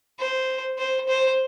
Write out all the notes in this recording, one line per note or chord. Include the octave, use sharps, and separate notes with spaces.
C5
C5
C5